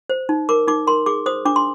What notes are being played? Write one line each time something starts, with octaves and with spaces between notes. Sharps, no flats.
C5
D#4
A#4 D6
D#4 D6
A#4 C6
G#4 D6
C5 D#6
D4 D6
C6